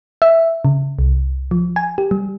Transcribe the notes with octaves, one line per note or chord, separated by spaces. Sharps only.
E5
C#3
C2
F3
G#5
G4
G3